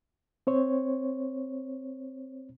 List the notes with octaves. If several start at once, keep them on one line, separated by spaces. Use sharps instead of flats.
C4 C5 C#5